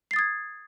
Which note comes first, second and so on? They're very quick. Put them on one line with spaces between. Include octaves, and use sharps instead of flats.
C7 A6 D#6 G#6